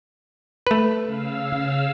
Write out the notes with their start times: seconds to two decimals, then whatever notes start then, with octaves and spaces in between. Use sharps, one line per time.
0.67 A3 B4
1.05 C#3 F5 E6